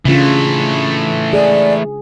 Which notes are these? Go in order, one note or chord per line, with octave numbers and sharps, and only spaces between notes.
C#3 E3 A3 D4 F4
G#4 D5